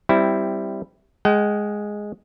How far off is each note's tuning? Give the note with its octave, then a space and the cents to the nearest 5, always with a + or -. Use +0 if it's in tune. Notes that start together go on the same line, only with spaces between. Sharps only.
G3 +0 C4 -10 E4 +0
G#3 +0 G5 -45